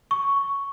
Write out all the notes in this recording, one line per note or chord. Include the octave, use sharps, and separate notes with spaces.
C#6